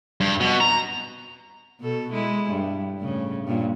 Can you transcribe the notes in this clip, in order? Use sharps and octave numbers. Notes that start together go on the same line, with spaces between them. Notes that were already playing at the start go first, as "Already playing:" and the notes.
G2
B2
A#5
B2 A4
G#3 E4
G2
A2 C#3
G2 A#2